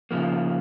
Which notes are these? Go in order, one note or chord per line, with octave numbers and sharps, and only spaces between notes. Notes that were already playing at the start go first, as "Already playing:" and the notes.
C#3 F3 A#3